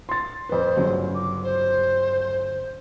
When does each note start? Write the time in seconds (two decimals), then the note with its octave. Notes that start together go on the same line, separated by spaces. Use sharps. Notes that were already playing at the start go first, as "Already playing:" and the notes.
0.09 C6 A6
0.49 F2 B4 C5
0.77 G1 C#3 F#3
1.14 D6
1.43 C5